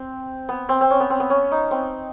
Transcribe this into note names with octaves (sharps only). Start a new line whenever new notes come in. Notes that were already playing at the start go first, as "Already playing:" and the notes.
Already playing: C4
B3
C4
C4
C#4
B3
C4
B3
C#4
D#4
C4